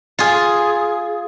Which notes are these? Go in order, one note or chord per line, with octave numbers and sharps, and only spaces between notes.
F4 G#4